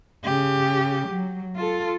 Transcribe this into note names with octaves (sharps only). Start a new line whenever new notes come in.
C#3 G4
F#3
F4 A4